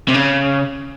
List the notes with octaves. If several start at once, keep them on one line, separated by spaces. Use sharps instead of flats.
C3
C#3